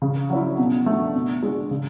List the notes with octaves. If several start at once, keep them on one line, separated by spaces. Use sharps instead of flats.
C#3
F#3 C#4 E4
B2
A3 D4 F#4
B2
G#3 D4 F#4
C#3